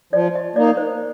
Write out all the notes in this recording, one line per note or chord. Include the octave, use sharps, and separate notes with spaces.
F3 D5
D#5
A#3 D#4 D5
C5